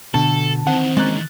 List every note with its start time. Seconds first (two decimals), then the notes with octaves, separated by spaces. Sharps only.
0.14 B2 D3 A4 A5
0.67 D#3 E3 C4 F#5
0.97 G#3 A#3 C#4 F#6 A6